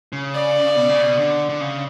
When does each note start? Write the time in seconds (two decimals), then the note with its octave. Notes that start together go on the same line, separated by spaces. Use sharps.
0.13 C#3
0.34 D5
0.76 B2
0.89 C#3
1.02 B2
1.18 D3
1.49 D3
1.61 C#3